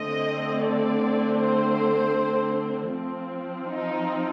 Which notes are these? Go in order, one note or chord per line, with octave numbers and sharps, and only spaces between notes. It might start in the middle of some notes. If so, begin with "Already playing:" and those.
Already playing: D3 A3 C4 D#5
D5
C5
F3 C4
D#4